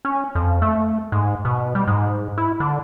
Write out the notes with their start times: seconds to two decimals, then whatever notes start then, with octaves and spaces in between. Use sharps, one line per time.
0.05 C#4
0.35 F2
0.62 A3
1.12 G#2
1.45 B2
1.75 G3
1.87 G#2
2.38 E4
2.60 D3